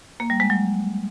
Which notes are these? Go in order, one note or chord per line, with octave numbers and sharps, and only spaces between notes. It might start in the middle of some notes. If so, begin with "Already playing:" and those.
A#3
G3
G#3
F#3